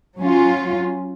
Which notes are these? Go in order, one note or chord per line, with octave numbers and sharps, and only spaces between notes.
F#3 C#4 F4